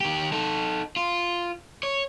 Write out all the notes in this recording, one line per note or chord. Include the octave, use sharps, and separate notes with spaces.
D#3 G4
D#4 A4
F4
C#5